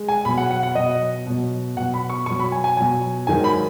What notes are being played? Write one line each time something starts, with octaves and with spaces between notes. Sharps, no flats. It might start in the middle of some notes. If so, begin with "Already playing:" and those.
Already playing: G#3
G#5
B2 F#3 B5
F#5
F#5
F#5
B2 F#3 D#5
B2 F#3
B2 F#3 F#5
B5
C#6
B2 F#3 C#6
B5
G#5
G#5
B2 F#3 G#5
G#2 D#3 F#3 G#5
B5